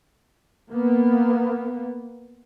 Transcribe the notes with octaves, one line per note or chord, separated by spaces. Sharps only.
A#3 B3